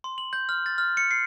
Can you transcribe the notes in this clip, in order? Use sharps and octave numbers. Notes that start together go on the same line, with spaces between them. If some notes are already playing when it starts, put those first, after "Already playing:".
C6
F#7
G6
F6
A6
F6
C#7
C7